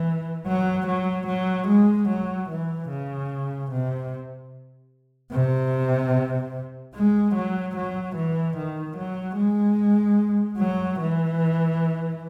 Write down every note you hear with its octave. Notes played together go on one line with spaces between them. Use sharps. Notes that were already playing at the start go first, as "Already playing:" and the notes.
Already playing: E3
F#3
F#3
F#3
G#3
F#3
E3
C#3
C3
C3
G#3
F#3
F#3
E3
D#3
F#3
G#3
F#3
E3